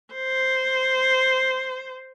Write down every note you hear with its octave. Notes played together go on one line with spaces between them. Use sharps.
C5